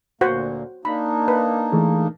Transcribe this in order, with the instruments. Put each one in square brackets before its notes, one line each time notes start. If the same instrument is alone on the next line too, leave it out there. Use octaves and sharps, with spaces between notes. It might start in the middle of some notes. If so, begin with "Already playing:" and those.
[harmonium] D2 A#2 A#3 [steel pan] F#4 C5 F#5
[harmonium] A#3 D4 D#4 [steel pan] B5
[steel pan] B4
[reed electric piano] E3 A3 G#4